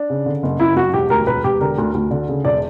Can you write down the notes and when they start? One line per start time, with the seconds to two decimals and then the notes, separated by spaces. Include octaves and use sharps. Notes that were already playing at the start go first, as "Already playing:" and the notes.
Already playing: D4
0.10 C#3
0.26 D3
0.43 F#1
0.60 F#1 E4
0.76 F#2 F#4
0.93 E1 G4
1.10 D2 A#4
1.27 E1 B4
1.44 E1 G4
1.61 D3 A#4
1.78 D2
1.94 D2
2.11 D3
2.29 C#3
2.44 E1 D5